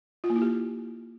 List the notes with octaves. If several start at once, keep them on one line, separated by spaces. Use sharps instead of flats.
F4
A#3
E4
G4